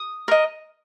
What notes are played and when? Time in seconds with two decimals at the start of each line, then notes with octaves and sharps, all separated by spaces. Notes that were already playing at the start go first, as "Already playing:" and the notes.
Already playing: D#6
0.28 A#4 D#5